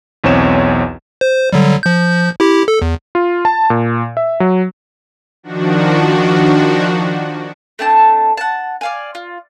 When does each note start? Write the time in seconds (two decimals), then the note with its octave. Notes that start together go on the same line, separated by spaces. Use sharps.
0.24 B1 E2 C4 C#5 E7
1.21 C5
1.53 D3 F#3 G3
1.83 F3 G6
2.40 E4 G4
2.68 A4
2.82 E2
3.15 F4
3.45 A5
3.70 A#2
4.17 E5
4.40 F#3
5.43 D#3 F3 D4 F#4
7.79 A3 C4 D4 A5
8.37 F#5 A5
8.81 D5 F5 G#5
9.15 F4